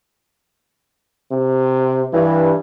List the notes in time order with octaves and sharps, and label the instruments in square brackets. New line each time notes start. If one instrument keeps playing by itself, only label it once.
[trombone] C3
[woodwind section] G2 [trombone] E3